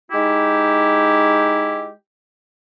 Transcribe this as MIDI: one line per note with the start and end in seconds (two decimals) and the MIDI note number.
0.11 1.90 56
0.11 1.90 63
0.11 1.90 64
0.11 1.90 67